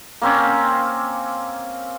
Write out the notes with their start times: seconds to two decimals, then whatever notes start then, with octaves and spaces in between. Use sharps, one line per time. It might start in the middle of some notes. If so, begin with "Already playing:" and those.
0.22 A#3 C4 C#4